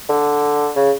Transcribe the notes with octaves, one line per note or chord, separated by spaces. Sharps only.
D3
C#3